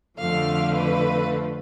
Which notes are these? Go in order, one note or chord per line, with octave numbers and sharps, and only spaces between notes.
F2 D3 F3 A3 F5
B4